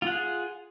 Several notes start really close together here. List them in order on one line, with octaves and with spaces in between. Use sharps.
F4 F#5 G#4